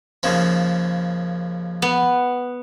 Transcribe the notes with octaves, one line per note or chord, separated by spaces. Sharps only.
D#2 C#3 F3
B3